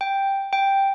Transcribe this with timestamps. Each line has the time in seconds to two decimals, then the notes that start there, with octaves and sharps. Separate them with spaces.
0.01 G5
0.53 G5